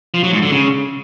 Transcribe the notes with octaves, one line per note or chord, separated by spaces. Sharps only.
F3
F#3
G#2
D3
C#3